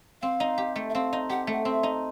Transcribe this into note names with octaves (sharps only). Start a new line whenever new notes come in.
C4 F5
D#4
G4
A3
E5
C4 F5
D#4
G4 F#5
A3
F#5
C4 E5
D#4